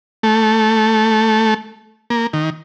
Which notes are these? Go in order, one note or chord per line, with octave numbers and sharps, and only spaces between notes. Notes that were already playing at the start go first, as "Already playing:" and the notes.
A3
A#3
D#3